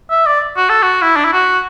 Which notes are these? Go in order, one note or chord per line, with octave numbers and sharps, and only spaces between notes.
E5
D5
F#4
A4
F#4
E4
D4
E4
F#4